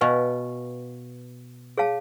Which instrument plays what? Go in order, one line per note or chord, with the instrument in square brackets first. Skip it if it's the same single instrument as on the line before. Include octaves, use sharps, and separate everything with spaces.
[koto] B2 [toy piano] B4 F5 G#5 C#6
[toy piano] G#4 C#5 F5 A5